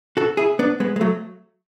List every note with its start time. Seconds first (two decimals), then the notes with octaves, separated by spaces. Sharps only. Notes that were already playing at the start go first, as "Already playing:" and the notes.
0.17 F#4 A4
0.37 E4 G#4
0.59 B3 D4
0.80 G#3 B3
0.96 G#3
1.01 F#3 A3